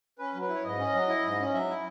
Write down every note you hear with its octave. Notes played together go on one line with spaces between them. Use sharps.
C#4 B4
F#3
B4
E4
C#5
G#2 D#5
C#4
F#3
E4
G#2
C#4
F#3 E5
E4